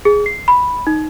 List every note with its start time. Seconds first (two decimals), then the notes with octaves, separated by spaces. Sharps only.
0.05 G#4
0.26 C7
0.48 B5
0.87 D#4